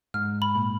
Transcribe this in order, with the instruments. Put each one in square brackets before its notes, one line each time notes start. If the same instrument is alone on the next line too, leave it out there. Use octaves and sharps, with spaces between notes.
[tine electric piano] G#2 G#3 [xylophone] F6
[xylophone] B5
[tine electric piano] A#2 A#3